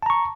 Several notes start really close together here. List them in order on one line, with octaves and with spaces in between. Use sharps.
A5 A#5 C#6